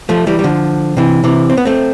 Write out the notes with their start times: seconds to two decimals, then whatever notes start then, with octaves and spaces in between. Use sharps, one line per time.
0.09 F3 A3
0.27 E3 G3
0.39 G3
0.44 D3 F3
0.97 C3 E3
1.24 C3 E3
1.50 C4
1.57 B3
1.65 A3 C4